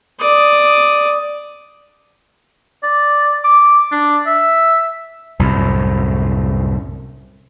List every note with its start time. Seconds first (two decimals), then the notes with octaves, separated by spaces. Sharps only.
0.20 D5 D#6
2.83 D5
3.44 D6
3.92 D4
4.27 E5
5.39 C2 F#2 A2